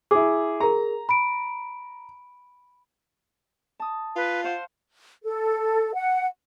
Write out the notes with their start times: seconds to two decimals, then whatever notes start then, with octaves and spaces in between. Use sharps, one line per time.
0.11 E4 G#4 D6
0.60 G#4 A#4 A#5
1.09 B5 D7
3.80 A5 D#6
4.16 F4 B4
4.44 C5 F5 F#5 C6
5.23 A4
5.94 F#5